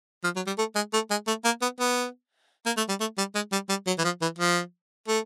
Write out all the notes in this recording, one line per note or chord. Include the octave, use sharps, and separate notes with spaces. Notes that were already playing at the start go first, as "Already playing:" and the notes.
F3
F#3
G3
A3
G#3
A3
G#3
A3
A#3
B3
B3
A#3
A3
G3
A3
G3
G#3
G3
G3
F#3
E3
F3
E3
F3
A3